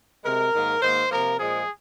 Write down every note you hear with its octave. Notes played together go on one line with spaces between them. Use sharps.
C3 G#3 A#4
G#2 D#3 A#3
G#2 D#3 A#3 C5
C3 F3 A#3 A#4
A#2 F3 G#3 G#4